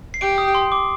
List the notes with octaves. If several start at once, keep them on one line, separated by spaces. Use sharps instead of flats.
C7
G4 D7
D#6
C6
D6